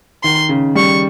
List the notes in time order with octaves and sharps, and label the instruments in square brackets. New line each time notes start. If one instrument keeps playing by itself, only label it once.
[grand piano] D#3 [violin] C6
[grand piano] C#3
[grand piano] G3 [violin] C#6